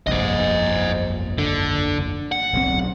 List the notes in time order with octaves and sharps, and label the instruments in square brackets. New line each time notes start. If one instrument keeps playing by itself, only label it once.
[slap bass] F1 A#1 G2 [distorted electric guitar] C5 D#5
[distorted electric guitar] D3
F#5
[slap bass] D1 B1 C4